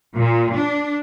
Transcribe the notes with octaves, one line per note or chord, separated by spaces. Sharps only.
A#2
D4